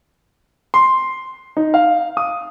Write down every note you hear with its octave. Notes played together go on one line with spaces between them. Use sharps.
C6
D#4
F5
D#6